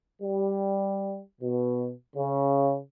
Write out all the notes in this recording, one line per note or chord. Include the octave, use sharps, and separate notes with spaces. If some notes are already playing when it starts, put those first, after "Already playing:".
G3
B2
C#3